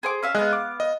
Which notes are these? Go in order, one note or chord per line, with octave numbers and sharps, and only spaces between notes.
G#4 C5 D6
C#4 E5 F5
G#3 B3 G#4 D#5 F5 F#6
D6
D#5